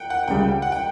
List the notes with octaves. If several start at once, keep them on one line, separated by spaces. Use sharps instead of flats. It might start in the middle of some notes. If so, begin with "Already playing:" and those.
Already playing: F#5 G5
F#5
C#2 C#3 G3 G5
F#5
G5